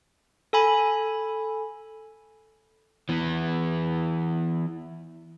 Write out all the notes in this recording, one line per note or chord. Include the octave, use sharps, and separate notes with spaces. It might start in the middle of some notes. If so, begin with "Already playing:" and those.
A4 G#5 B5
E3 B3